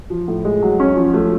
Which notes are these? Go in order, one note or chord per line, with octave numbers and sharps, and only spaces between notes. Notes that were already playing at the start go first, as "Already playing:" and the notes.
F3
A2
G#3
F#3
C#4
F3
A3